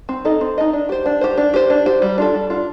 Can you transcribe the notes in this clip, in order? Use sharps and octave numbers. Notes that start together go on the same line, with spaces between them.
C4
D#4 A4 D#5
C4
D#4 A4 D#5
D4
G4 C5
D4
G4 C5
D4
G4 C5
D4
G4 C5
G3
D4 F4 A4
G3
D4 F4 A4